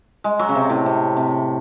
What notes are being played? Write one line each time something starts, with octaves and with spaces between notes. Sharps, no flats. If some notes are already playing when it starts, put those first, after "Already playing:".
G#3
F#3
C#3
C3
A2
C3
C3